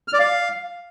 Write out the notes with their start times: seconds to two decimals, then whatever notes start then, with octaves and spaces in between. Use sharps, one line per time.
0.08 F6
0.14 D5
0.19 F5